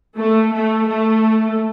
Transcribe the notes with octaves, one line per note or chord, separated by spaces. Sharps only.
A3
A3
A3